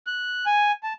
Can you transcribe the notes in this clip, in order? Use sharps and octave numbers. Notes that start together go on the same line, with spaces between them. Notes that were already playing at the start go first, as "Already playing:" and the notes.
F#6
G#5
A5